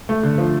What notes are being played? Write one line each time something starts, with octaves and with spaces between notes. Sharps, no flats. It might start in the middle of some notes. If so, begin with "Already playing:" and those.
A3
D3
F3